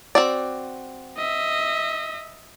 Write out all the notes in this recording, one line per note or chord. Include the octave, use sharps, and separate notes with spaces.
C4 F#4 D5
D#5 E5